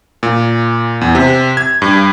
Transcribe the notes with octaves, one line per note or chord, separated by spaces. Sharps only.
A#2
E2
C3
G#6
G2